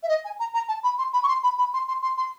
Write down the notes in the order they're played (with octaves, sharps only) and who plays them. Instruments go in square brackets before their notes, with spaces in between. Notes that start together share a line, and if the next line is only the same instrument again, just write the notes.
[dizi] E5
D#5
G#5
A#5
A#5
A5
B5
C6
B5
C#6
C6
B5
B5
C6
C6
C6
C6